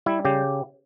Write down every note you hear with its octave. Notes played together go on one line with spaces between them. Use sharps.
G3 E4
C#3 G4